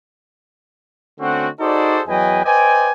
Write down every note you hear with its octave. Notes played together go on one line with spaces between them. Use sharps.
D3 A3 C4 C#4 F#4
D#4 F#4 G#4 A4 C5 D5
E2 F#3 B4 D#5 G5 G#5
B4 C5 D5 D#5 G5 G#5